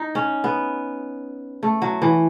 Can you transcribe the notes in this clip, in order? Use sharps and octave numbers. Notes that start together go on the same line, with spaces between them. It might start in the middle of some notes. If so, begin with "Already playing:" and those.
Already playing: D#4
C#4
B3
A3
F#3
E3